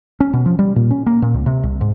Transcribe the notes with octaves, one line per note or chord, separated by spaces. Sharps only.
C#4
B2
F3
G3
A#2
C#4
A#3
A#2
C#2
C3
C2
G#2